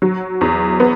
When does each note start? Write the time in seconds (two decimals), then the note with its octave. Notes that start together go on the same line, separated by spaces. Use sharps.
0.02 F#3
0.41 E2
0.80 B3